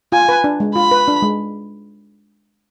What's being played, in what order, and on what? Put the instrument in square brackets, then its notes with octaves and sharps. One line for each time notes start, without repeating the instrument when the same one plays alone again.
[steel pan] F4 [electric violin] G#5
[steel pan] B4
D4
G#3
[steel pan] F4 [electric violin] B5
[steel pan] B4
D4
G#3